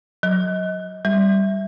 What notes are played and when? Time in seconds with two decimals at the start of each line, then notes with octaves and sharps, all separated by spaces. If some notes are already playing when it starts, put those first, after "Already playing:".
0.23 F#3
1.05 G3